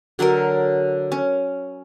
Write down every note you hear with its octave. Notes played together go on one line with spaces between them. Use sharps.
D3 F#3 A4 A#4
C#4